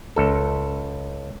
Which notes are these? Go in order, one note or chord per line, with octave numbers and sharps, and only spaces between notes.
C#2 A4